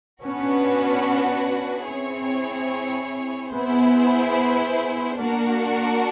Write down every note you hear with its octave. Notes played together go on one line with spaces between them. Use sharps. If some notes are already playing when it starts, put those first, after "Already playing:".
B3 C#4 D4 F#4 B4
C4 E4 G#4 C#5
B3 E4 G#4 C5
A#3 D4 F#4 A#4